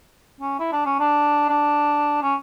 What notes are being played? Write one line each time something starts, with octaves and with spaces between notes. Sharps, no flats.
C#4
E4
D4
C#4
D4
D4
C#4